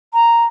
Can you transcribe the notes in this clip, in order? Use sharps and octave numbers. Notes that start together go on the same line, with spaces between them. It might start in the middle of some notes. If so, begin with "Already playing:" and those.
A#5